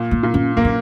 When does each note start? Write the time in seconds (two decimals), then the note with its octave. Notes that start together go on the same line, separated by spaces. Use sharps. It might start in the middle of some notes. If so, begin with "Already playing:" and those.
Already playing: A#2
0.11 A#3
0.23 A#2
0.34 C#4
0.57 A#3 D#4
0.65 C#4